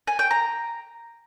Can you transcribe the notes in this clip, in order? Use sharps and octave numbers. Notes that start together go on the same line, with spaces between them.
G#5
G5
A#5